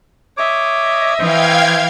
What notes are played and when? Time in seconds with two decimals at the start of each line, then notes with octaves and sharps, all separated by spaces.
0.37 C#5 D#5 E5 D6
1.19 E3 C5 F5 G5 G#6